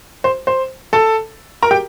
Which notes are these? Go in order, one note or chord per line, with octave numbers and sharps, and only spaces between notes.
C5
C5
A4 A5
A#4 A#5
G4 G5